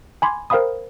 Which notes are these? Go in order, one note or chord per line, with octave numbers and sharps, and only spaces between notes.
G#5 B5 C6 D6 G#6
A#4 C5 F5 G5 B5 D#6